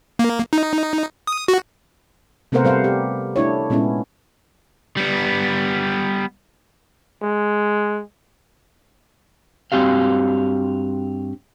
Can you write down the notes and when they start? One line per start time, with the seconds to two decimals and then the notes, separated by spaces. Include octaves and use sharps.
0.19 A#3
0.53 D#4
1.27 D#6
1.48 F#4
2.52 C3 A3 B3 A#4 C5 F#5
2.64 G3 C5 F5 F#5
2.84 G4
3.36 A3 D4 E4 C#5
3.70 A#2 G#3 B3 C#4 E4
4.97 G3 B3
7.23 G#3
9.72 G2 C4 F#4 G4 F5